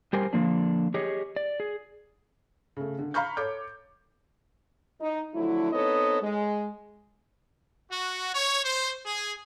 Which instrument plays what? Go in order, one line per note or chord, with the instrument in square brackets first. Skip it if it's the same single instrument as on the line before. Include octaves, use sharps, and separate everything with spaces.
[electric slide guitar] G3 G4 A#4 C5 G#5
D3 F3 A#3 D4
G4 G#4 C#5 D#5
D5
G#4
[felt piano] C#3 A3
D3
F5 A#5 B5 C#6 F6 G6
A4 C#5 D6 G6
[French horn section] D#4
D3 F3 F#3 A3 E4
B3 C4 D#4 A4 C#5 D#5
G#3
[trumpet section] F#4
C#5
C5
G#4